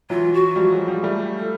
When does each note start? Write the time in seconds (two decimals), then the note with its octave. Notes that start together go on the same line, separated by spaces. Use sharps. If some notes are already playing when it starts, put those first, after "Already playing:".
0.10 E3 F#3 F4
0.33 F#4
0.56 F3 G3
0.72 F#3 G#3
0.88 F3 G3
1.03 G3 A3
1.38 A4